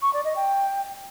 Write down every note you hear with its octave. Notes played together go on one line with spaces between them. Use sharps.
C#6
D5
D#5
G5